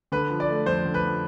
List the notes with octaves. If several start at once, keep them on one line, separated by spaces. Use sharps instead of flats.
D3 B4
F3
D5
A3
F2 C5
D3
B4
F3